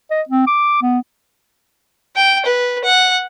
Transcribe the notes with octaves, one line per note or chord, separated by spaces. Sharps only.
D#5
C4
D6
B3
G5
B4
F#5